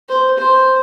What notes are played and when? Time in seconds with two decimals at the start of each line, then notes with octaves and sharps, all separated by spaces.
0.09 C5
0.38 C5